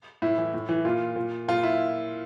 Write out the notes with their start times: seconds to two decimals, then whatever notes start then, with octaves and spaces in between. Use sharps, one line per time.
0.22 A2 E4
0.38 E3
0.54 A2
0.69 E3
0.85 A#2 F4
1.16 A#2
1.48 A#2 F4
1.63 E4